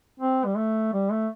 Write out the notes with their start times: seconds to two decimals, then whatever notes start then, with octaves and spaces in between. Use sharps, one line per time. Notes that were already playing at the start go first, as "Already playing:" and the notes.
0.20 C4
0.45 G3
0.56 A3
0.93 G3
1.12 A3